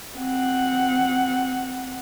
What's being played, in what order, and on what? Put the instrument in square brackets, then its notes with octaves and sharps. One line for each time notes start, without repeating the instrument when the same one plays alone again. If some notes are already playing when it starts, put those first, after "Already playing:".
[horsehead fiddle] C4 F#5